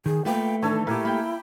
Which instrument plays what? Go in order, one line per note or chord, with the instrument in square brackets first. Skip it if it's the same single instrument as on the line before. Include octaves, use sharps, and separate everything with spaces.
[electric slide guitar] D#3 [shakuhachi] G#4
[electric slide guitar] A3 [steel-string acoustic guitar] A#3 F4 B4 [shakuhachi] G5
[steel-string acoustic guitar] D#3 E3 [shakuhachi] D4 [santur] A4 C#5 G#5
[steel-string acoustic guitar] A#2 [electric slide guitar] A3 G4 [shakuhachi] E4 [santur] A#4 G#5 D6
[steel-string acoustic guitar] A#3 [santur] G5 B5